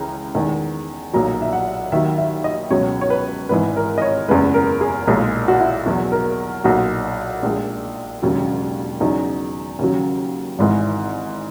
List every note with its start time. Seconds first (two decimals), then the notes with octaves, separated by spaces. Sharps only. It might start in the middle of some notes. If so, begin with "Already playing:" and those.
Already playing: C#2 C#3 E3 A#5
0.35 E2 D#3 G#3
1.13 B1 A#2 F#3 A#5
1.42 E5
1.53 F#5
1.92 D#2 D#3 F#3 E5
2.18 E5
2.44 D#5
2.71 C#2 B2 F#3 C#5
3.01 C#5
3.10 B4
3.49 G#1 G#2 E3 B4
3.77 A#4
3.98 D#5
4.02 C#5
4.28 F#1 E2 C#3 G#3 B4
4.54 A#4
4.81 G#4
5.07 B1 A#2 G#3
5.48 F#4
5.60 E4
5.86 E2 B2 F#3 F#4
6.12 A#4
6.64 B1 A#2 F#3 F#4
7.43 A#1 A#2 G#3
8.22 E1 D#2 C#3 F#3
9.00 E2 C#3 F#3 D#4
9.79 D#2 C#3 F#3
10.59 G#1 G#2 E3 G#3